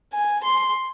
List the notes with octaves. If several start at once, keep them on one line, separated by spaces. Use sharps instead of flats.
G#5
C6